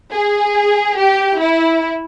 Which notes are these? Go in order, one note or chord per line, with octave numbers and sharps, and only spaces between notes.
G#4
G4
E4